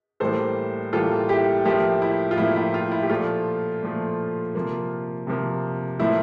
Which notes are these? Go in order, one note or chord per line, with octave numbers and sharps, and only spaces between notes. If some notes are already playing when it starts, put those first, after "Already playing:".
A2 E3 G3 A#3 A4 C5
A2 E3 G3 A#3 F4 A4
E4 G4
A2 F3 A#3 E4 G4
E4
F4
A2 F3 A#3 E4
E4
F4
E4
G4
A#2 F3 A3 F4
A#2 F3 A3
C3 F3 A#3
C3 F3 A#3
A2 F3 A#3 E4